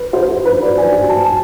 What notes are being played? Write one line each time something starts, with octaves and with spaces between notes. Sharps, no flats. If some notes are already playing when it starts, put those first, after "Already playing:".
Already playing: B4
C5
B4
D5
G#5
G#5
A5